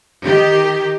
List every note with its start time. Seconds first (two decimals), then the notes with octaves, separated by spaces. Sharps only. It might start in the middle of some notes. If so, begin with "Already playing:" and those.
0.23 D#3 G4